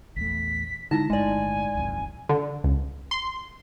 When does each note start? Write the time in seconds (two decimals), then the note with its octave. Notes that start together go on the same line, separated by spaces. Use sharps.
0.16 A#1 E2 A3 B6
0.91 D3 G#3 D#4 E4 A5 A#6
1.10 G1 A2 G#3 D5 G#5
1.75 D#1 B1 F2
2.29 D3
2.64 C#2
3.11 C6